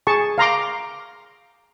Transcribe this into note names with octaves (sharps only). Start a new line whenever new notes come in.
G#4 A5 C#6
F5 A#5 C6 D6